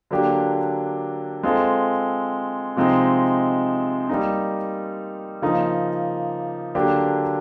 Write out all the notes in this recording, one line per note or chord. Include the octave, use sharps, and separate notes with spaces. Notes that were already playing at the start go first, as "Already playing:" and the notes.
D3 F#3 A#3 D4 G4
G#3 C4 F4 A4
C3 F3 G#3 C4 D#4
G3 A#3 D#4
C#3 F3 A#3 D#4
D3 F#3 A#3 D4 G4